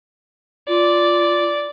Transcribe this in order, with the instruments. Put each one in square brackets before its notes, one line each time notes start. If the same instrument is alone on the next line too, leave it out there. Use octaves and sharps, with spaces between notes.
[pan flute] F4 [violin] D5